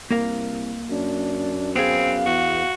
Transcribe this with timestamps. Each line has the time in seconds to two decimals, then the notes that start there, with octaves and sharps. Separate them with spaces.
0.11 C2 A#3 A#4 F5
0.89 F#2 D4
1.76 B3 C4 G#4 F5
2.26 E2 F#4